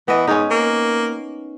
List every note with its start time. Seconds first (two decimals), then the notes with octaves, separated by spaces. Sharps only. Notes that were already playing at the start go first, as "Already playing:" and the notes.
0.08 E3 B3 D#5
0.27 G#2 C#4 D#4
0.50 A#3